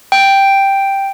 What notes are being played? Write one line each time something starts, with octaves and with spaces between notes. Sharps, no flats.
G5